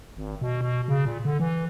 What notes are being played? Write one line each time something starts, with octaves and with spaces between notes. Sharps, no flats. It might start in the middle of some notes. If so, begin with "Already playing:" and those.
G#1
B2
B2
C#3
A#2
D3
E3